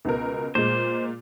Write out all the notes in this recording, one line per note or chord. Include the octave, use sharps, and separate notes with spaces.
C#2 B2 A#4
A#2 G#3 C5